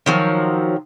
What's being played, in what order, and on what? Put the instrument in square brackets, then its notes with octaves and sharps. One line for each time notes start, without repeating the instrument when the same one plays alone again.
[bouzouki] D#3 F3 F#3